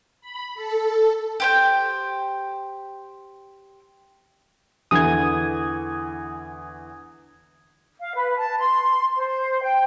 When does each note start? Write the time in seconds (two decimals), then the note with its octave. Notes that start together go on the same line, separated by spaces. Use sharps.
0.21 B5
0.55 A4
1.40 G4 C5 G5
4.91 E2 D3 E3 D#6 G#6
8.01 F5
8.14 B4
8.37 A5
8.59 C6
9.17 C5
9.61 G5